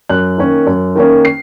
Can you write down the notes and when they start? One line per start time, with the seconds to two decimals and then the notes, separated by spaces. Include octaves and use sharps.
0.09 F#2 F#6
0.38 D#3 A#3 C#4
0.67 F#2
0.95 D#3 A#3 C#4
1.25 C7